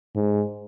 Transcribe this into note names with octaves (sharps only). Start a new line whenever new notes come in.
G#2